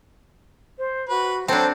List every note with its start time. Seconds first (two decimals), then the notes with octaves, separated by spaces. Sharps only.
0.78 C5
1.09 F#4 B4
1.48 F#3 C4 D4 A4 C5